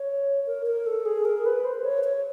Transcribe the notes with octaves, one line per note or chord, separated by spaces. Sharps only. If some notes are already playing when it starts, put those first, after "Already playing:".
Already playing: C#5
A#4
A#4
A4
G#4
A#4
B4
C5
C#5
C#5